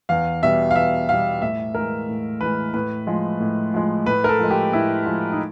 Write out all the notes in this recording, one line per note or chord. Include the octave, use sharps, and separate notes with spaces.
E2 F5
B2 G3 E5
F5
E2 E5
B2 G3 F5
A2 E5
E3 G#3 A#4
A2
E3 G#3 B4
A2 B4
F3 G#3
A2
F3 G#3
A2 B4
A#4
A4
F3 G#3
G4
A2 E4
F3 G#3
D#4